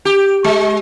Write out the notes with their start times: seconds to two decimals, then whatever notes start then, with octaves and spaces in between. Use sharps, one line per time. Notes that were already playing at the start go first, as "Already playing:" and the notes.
0.05 G4
0.44 G#3